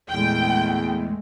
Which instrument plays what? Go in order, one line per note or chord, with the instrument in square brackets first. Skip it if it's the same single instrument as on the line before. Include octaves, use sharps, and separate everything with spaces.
[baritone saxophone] E2 [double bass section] A#2 G#3 A3 [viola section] G5